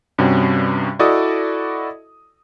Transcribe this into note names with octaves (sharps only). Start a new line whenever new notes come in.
G2 C3 G3 C#4 F#4
E4 F#4 A4 D5 D#5 D#6